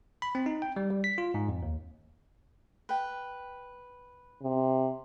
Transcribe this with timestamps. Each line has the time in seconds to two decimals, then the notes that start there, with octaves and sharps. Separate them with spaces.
0.22 B5
0.35 C4
0.46 D#4
0.62 G5
0.76 G3
0.90 G3
1.04 B6
1.18 F4
1.34 G#2
1.49 F2
1.63 D#2
2.89 B4 G5
4.42 C3